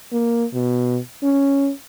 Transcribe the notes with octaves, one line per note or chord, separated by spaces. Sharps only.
A#3
B2
C#4